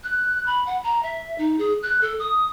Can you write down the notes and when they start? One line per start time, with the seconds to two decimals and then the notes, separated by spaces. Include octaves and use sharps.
0.04 F#6
0.46 B5
0.66 F#5
0.84 A#5
1.03 E5
1.38 D#4
1.58 G#4
1.83 F#6
2.01 A4
2.19 D#6